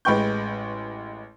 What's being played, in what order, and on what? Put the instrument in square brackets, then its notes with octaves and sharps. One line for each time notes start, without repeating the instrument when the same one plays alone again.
[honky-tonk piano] A1 G#3 B4 G5 C#6 G6